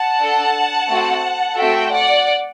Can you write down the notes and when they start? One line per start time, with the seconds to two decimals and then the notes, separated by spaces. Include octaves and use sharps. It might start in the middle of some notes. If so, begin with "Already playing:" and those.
Already playing: F#5 A5
0.18 D4 A4
0.88 A3 C4 F#4
1.57 A3 C4 F#4 A4 E5 G5
1.92 D5 F#5